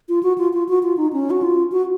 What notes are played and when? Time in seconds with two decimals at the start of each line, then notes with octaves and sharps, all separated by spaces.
0.09 F4
0.23 F#4
0.38 F4
0.53 F4
0.69 F#4
0.83 F4
0.97 D#4
1.13 C#4
1.30 F#4
1.43 F4
1.72 F#4